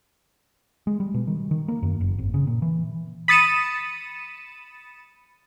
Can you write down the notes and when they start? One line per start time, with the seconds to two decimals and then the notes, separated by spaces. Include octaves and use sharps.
0.87 G#3
1.00 G3
1.14 B2
1.27 D#3
1.51 D#3
1.68 A#3
1.83 F#2
2.01 F#1
2.18 G#1
2.34 C#3
2.47 A#2
2.62 E3
3.28 B5 D#6 A6 C#7 D#7 E7